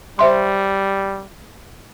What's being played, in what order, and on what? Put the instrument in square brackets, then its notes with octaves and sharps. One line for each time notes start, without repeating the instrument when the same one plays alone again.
[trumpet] G3 [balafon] C5 E5 C6